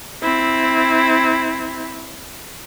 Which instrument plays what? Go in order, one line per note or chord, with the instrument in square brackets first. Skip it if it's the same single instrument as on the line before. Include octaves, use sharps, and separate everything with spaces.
[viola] C4 E4